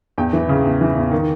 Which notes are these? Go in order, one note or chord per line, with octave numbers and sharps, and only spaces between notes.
E2 G5
E3
C#3
E2
E3
E2
D#3